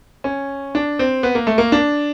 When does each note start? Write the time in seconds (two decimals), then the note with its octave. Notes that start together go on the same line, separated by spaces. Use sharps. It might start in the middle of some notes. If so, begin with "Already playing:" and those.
0.24 C#4
0.75 D4
0.99 C4
1.23 B3
1.35 A#3
1.47 A3
1.58 A#3
1.72 D4